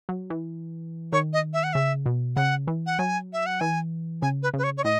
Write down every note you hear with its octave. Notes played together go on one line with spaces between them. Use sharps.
F#3
E3
D#3 C#5
D#5
E5
F#5
C#3 E5
B2
C#3 F#5
E3
F#5
F#3 G#5
E5
F#5
E3 G#5
C#3 G#5
B4
C#3 B4
C#5
C#5
A2 D#5